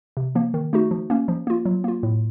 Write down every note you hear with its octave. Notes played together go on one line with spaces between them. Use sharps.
C3
F3 A#3
D#3
A3 D#4 F#4
F3
A#3 C#4
F3
A#3 F4
F#3
A#3 F4
A2